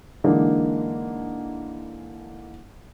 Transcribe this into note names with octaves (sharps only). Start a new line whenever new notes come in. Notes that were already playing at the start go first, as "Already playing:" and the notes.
D3 E3 G#3 A#3 D4 D#4